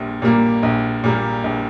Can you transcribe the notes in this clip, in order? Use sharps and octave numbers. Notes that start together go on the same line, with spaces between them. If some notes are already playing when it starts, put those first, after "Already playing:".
Already playing: A#1 A#2 G3
A#2 G3 A#3
A#1
A#2 G3 A#3
A#1